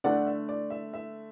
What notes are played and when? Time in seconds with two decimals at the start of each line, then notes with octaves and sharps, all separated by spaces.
0.04 D3 A3 D5 F#5
0.26 E5
0.49 D5
0.70 E5
0.94 E5